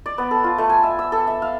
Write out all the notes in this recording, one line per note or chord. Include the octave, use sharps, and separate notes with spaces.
D5
B3
A4
F4
A3
G#5
E5
E6
A4
E5
F5